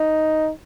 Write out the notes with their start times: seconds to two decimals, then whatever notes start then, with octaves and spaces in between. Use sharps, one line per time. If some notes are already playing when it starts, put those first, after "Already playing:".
Already playing: D#4